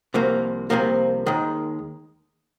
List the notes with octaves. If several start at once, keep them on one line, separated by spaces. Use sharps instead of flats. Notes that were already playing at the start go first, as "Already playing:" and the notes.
C2 C3 F3 A#3
C2 C3 F3 A#3
D#2 D#3 G#3